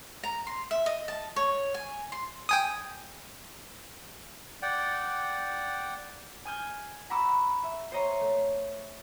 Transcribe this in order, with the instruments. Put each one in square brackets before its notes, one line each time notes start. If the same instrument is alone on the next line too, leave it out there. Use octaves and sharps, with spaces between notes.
[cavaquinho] A#5
C6
E5
D#5
A5
C#5
G#5
C6
[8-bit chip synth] G5 G#5 D#6
[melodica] D5 F#5 G5
[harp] G#5 D#6 F6 G6 G#6
F#5 A#5 B5 C#6 D6 E6
E5
C5 C#5 D#5 A#5 C6 C#6
A3